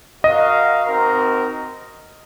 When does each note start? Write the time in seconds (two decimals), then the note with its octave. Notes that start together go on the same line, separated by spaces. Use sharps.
0.23 F#4 A#4 D#5 F5
0.86 C4 D#4 F#4 A#4